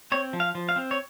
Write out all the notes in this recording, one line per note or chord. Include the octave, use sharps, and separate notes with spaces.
C4 C#5
F3
F5
F3
F5
C4
C#5